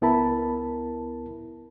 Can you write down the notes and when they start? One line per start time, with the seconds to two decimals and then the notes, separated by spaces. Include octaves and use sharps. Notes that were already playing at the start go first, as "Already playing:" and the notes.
0.02 C#2 B3 E4 A#4 A5 B5